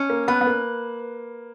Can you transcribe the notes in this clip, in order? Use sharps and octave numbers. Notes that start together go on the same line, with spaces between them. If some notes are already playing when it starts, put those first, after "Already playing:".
Already playing: C#4
A#3
B3 B4
B3
A#3